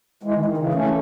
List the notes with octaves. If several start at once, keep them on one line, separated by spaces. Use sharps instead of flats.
E3 G#3
D#3
D#3
C#3 E3
A3 C#4